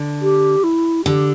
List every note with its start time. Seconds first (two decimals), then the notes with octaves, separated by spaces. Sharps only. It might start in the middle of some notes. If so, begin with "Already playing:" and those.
Already playing: D3
0.22 G4
0.63 E4
1.05 D3 G4